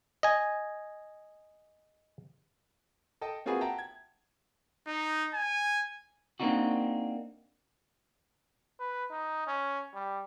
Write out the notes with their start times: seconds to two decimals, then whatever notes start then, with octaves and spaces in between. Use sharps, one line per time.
0.23 D#5 G#5
3.21 A4 D#5 G5 A5
3.45 A#3 C4 F4 F#4 G#4 B4
3.60 E5 F#5 G5 A5 A#5
3.78 G#6
4.87 D#4
5.34 G#5
6.40 A#3 C4 D4 D#4 F#4
8.80 B4
9.11 D#4
9.47 C#4
9.94 G3